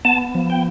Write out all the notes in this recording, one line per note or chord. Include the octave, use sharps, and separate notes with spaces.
B3 A5
F3
G5